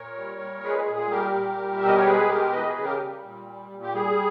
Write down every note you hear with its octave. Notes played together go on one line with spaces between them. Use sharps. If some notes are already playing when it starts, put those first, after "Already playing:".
Already playing: A#2 A#4 C#5
G3
A#2
G#3 G#4 B4
G#4
A#2
G#4
G3 G4 A#4
A#2
G3
E5
B2
D#5
C#5
G#3 G#4 B4
B2 G4 A#4
E3 B4 D#5
G#4 B4
C#3
G4 A#4
G3
A#2
G3
A#2
G4
G3 G#4